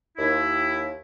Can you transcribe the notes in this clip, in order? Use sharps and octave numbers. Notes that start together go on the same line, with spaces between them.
D#2 E4